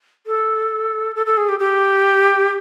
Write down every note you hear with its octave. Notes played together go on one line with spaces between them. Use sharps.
A4
A4
A4
G#4
G4
G4